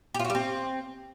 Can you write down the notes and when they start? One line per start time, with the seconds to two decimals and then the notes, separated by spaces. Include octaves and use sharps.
0.14 G4
0.20 F4
0.25 F#4
0.30 G3
0.35 C4